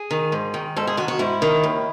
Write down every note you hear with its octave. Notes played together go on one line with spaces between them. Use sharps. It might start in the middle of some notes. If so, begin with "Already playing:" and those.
Already playing: G#4
D#3
G#2
D#3
G#2 A4
G#4
D#3 F#4
F#4
G#2 E4
D#3
D#2